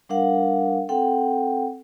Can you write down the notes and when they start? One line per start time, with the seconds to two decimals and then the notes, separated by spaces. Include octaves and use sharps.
0.09 G3 D4 A#4 F5 F#5
0.89 C4 A4 F#5 G5